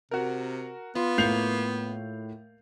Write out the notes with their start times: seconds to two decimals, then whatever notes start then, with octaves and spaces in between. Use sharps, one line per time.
0.11 C3 F#4 A#4
0.95 B3 F4
1.18 A2 A#3 C#6 G6 C7 F7